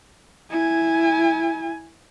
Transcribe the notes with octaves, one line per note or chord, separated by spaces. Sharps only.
E4 G#5